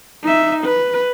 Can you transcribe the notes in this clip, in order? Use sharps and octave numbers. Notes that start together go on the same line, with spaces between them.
D#4 E5
B4